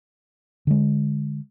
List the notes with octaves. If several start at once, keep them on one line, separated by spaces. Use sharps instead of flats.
D3 G#3